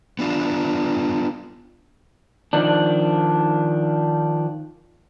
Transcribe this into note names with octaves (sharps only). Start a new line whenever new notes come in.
B3 D4 F4
D#3 F3 D4